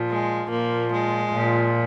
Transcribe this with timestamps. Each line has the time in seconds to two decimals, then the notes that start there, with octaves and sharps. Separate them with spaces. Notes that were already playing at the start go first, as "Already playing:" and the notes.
Already playing: A#2 F3
0.09 G#3
0.50 A#2 F3 A#3
0.91 G#3
1.31 A#2 F3